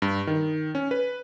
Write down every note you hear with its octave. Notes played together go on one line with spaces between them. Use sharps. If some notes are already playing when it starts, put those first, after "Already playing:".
G2
D#3
C#4
B4